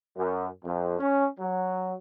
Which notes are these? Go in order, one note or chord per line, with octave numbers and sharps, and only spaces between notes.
F#2
F2
C#4
F#3